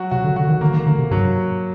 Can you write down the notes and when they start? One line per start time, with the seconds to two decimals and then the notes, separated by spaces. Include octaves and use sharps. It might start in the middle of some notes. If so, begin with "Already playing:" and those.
Already playing: F#3 F#4
0.11 C3 F#4
0.24 D3
0.36 D3 F#4
0.49 D#3
0.61 D3 A#3
0.74 D#3
0.86 D3 A#3
0.99 C3
1.11 G2 F#3